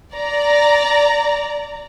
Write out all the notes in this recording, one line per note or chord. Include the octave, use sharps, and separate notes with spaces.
D5 A#5